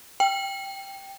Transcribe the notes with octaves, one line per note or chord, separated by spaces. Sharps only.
G5